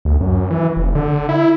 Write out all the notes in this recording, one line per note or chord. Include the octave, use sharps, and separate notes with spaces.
D2
F#2
E3
F1
D3
E4